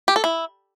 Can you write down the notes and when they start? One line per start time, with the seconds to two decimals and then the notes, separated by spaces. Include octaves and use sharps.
0.08 G4
0.16 A4
0.24 E4